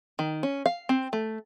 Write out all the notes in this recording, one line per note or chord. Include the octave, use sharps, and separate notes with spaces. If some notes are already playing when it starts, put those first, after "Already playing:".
D#3
C#4
F5
C4
A3